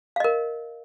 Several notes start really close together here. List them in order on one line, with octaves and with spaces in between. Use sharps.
F5 D#5 A#4